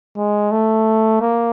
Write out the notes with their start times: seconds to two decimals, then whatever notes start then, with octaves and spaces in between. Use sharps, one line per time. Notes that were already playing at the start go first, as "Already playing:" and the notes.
0.17 G#3
0.51 A3
1.21 A#3